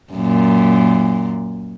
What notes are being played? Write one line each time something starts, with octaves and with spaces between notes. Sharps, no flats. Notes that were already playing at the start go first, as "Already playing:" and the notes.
F#2 A#2